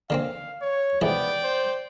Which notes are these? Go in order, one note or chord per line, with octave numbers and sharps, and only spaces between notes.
D3 A#3 C4 F5
C#5
C2 G#2 E3 B3 D5 G5
C5